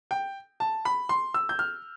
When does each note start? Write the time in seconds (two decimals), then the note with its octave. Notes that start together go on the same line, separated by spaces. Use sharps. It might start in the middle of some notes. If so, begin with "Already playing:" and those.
0.11 G5
0.60 A5
0.85 B5
1.09 C6
1.34 E6
1.49 G6
1.59 F6